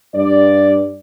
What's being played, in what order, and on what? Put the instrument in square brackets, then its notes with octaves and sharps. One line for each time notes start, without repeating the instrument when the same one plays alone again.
[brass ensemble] G2 D5